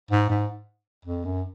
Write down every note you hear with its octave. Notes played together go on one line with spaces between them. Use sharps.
G#2
G#2
F2
F#2